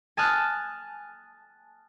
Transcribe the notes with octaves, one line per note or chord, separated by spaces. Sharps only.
G#5 A5 D#6 F6 F#6